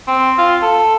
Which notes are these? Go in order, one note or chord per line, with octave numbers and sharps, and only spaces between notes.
C4
F4
A4